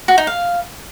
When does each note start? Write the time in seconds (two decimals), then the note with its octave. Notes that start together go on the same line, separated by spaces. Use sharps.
0.08 F#4
0.18 D#4
0.27 F5